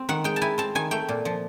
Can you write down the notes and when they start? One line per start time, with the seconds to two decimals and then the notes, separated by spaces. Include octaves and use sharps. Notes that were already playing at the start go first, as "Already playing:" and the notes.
Already playing: C4
0.09 D#3 F#5
0.24 G#3 G5
0.36 A5
0.41 E4 G#5
0.58 C4 A5
0.75 D#3 G#5
0.91 A3 G5
1.09 A#2
1.25 F3